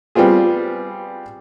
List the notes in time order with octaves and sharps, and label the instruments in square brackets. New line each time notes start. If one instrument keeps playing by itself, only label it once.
[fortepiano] G3 B3 C4 F4 G#4